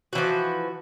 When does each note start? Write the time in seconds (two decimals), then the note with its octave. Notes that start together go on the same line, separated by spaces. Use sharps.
0.13 F#4
0.15 E3
0.18 F3